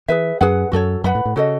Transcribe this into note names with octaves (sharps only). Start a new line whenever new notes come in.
E3 G#4 B4 E5
F#2 G#4 B4 F#5
F#2 F#4 A4 C#5
F#2 B4 F#5 B5
A2
A2
C#3 F#4 A4 D#5